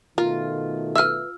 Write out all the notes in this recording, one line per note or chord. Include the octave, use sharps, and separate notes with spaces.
B2 D#3 A3 F4 A#4
B4 E5 E6 F6